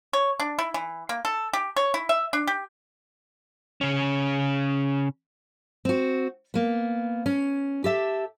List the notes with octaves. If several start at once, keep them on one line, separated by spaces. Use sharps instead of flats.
C#5
D4
E4
E3
A#3
A4
G4
C#5
E4
E5
D4
G4
C#3 C#4
C4 F#4
A#3 B3
C#4
G4 A4 E5